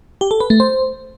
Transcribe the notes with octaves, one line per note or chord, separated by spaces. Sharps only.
G4
A4
B4
A3
C5